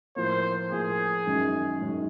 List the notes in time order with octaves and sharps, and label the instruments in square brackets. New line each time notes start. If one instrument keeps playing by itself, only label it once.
[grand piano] A2 F3 A#3 [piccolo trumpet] C5
[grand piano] A2 F3 A#3 [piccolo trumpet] G#4
[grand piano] F#2 D#3 G#3 C#4
F#2 D#3 G#3 C#4